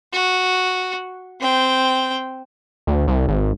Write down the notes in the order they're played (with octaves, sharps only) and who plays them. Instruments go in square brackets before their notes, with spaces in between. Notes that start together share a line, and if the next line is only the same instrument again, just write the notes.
[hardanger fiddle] F#4
C4 G5
[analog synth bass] D2
C2
G#1